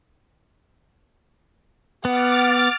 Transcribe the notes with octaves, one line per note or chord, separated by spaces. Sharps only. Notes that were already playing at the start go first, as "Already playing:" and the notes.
B3 F#5 D6 F6 A6